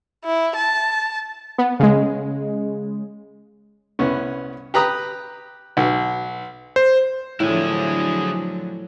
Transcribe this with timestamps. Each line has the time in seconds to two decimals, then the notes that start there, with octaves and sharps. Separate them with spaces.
0.25 E4
0.56 A5
1.58 B3
1.80 C#3 G#3
3.99 C2 B3 C#4
4.74 G4 B4 A#5 D#6
5.77 B1
6.76 C5
7.40 A2 D3 F3 F#3 E4 G#4